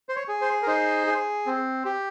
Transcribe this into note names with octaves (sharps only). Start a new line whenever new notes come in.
C5
C#5
G#4
C5
A#4
D#4 C5
G#4
C4
G4